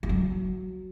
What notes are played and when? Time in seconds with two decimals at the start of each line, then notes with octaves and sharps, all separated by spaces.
0.03 E3
0.09 F#3